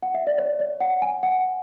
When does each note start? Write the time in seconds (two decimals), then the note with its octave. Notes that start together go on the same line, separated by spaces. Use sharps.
0.03 F#5
0.14 E5
0.27 D5
0.38 C#5
0.60 D5
0.80 F#5
1.02 G#5
1.23 F#5